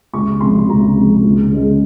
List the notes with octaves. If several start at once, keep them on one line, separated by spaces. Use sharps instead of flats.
C#2 C#6
C3 F3 G#3 C6
C#2 A#5
C3 F3 G#3
C#2
C#3 G#3